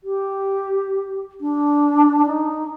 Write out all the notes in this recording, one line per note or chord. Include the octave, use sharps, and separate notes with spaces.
G4
D4
D#4